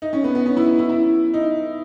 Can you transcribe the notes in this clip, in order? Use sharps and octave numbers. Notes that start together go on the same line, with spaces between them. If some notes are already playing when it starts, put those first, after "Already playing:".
D#4
C#4
B3
B3
C#4
E4
E4
E4
D#4